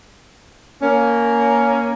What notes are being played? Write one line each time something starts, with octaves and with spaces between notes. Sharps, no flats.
A#3 C#4